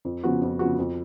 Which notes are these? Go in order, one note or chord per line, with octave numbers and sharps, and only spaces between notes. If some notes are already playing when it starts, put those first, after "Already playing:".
F2
C#3 F3 B3 F#4
F2
C#3 F3 B3 F#4
F2